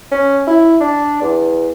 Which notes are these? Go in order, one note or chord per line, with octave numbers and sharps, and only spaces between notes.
C#4
E4
D4
E2